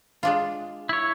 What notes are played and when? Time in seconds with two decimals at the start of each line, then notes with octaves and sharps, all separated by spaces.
0.23 G#3 D4 F4
0.89 E4 C#5